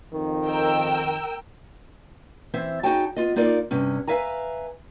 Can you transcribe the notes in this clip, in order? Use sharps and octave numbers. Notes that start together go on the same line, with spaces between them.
F2 D#3
A#4 G5 E6
E3 C4 C5 E5
D#4 F#4 G#4 C#5 G5 A5
B3 F4 D#5
A#3 D#4 F4 A#4 D5
G2 C3 C#4
B4 D5 E5 F5 G#5 A#5